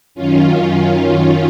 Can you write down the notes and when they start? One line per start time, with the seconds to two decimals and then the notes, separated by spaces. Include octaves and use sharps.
0.15 F#2 D#3 C#4 F4